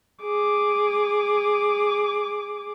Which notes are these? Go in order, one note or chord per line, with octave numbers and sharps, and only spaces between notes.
G#4 D6